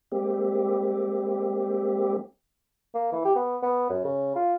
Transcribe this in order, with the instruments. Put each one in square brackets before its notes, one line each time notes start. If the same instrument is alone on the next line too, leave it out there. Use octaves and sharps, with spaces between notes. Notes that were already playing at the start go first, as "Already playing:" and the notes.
[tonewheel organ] G3 G#3 A#3 C4 G4
[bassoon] A#3
E3
G4
B3
B3
F#2
C#3
F4